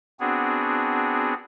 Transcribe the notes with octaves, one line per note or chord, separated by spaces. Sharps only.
B3 C4 D4 F#4 G#4